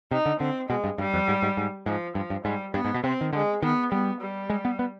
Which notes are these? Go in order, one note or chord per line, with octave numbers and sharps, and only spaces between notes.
C3 D#4
D3
D3 C4
B2 G#3
G2
G2 G3
F2
G#2
G#2
G#2
G#2 F3
G2 F3
G2
G#2 G3
G2 B3
G#2
B2
C3 C4
D#3
D3 G#3
D#3 B3
G3 B3
G3
G#3
B3
B3